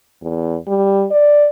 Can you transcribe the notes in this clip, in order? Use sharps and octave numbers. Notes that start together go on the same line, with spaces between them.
E2
G3
D5